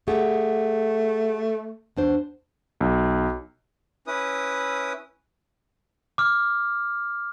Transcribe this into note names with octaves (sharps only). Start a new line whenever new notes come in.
A3 G4 G#4 F#5
E2 D4 C5
B1
C#4 E4 B4 D#6
D6 F6